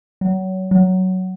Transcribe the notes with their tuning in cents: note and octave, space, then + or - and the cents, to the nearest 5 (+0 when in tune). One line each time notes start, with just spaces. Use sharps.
F#3 +25
F#3 +10